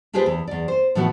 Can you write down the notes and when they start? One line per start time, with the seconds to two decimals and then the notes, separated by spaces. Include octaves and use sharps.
0.13 D4 F4 G4 G#4 B4 C5
0.26 E2
0.47 E2 D5
0.68 C5
0.95 A2 E3 F3 B3 F#4